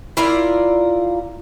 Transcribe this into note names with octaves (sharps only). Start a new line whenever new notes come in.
E4 F4 A#4 D5